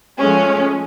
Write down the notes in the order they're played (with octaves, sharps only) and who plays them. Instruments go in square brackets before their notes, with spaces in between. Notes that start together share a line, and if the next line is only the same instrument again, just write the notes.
[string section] F3 G#3 A3 C#4